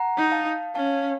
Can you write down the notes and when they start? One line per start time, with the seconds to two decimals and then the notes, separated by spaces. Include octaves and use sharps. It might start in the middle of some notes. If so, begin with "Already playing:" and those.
Already playing: F#5 A#5
0.17 D#4
0.32 F5 A5
0.75 C#4 F5 A5